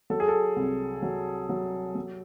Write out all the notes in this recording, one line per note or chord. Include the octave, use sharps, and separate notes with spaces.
F#3 A4
G#4
A4
C2
F#3
F#3
F#3